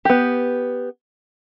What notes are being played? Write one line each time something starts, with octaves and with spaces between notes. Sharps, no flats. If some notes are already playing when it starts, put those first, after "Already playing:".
B3 G4